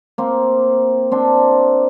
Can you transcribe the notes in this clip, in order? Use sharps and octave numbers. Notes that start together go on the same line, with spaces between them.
A#3 C4
C4 D4